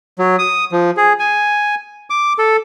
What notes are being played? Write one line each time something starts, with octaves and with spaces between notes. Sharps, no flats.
F#3
D#6
F3
G#4
G#5
D6
A4